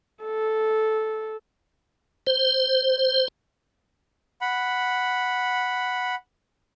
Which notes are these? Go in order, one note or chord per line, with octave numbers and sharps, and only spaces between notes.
A4
C5
F#5 B5